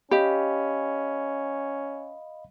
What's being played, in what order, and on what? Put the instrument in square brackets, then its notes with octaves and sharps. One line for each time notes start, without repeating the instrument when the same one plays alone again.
[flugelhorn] C#4 [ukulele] G4 [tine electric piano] D#5 F5 B5